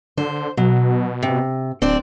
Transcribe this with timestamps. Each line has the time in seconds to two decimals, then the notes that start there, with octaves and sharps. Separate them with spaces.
0.17 D3 C5
0.57 B2 F#3
1.23 C3
1.82 D1 C4 D4 D5